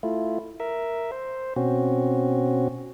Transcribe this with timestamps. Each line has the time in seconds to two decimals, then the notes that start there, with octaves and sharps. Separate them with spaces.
0.03 A3 E4 F4
0.60 A#4 E5
1.12 C5
1.56 B2 C4 C#4 F#4